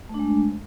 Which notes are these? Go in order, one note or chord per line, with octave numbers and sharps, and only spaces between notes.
G#3 A3 D4